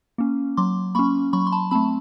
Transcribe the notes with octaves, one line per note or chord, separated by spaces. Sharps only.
A#3 C#4
F#3 C6 D6
A#3 C#4 B5 C#6
F#3 B5 C#6
C6
A5 B5
A3 C4 A5 B5